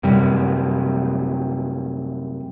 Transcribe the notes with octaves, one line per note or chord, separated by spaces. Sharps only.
F#2 C3 G3